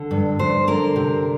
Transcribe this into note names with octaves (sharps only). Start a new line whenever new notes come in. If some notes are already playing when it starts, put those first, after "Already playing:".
Already playing: D3
G2
G2 C5
D3 A#4
C3